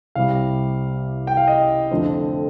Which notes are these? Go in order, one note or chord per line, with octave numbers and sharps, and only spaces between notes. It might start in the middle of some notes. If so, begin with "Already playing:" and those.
C2 C3 G3 F5
G5
F5
D#5
F2 D3 F3 A3 C4